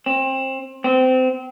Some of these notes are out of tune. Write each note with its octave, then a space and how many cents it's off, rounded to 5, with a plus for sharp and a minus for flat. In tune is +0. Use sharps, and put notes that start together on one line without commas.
C4 +25
C4 -25